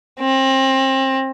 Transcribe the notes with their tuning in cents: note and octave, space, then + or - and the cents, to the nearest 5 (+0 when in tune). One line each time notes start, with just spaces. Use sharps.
C4 +30